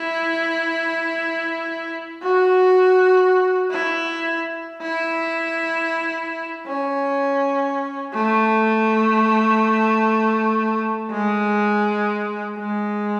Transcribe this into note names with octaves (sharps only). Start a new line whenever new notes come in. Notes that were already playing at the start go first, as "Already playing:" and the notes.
Already playing: E4
F#4
E4
E4
C#4
A3
G#3
G#3